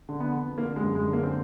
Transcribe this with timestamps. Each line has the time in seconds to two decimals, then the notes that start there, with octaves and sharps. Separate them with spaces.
0.09 D3
0.20 B3
0.33 F2
0.58 D3 A#3
0.76 G#3
0.82 F#2
0.95 G#3
1.07 D3
1.13 A#3
1.23 C4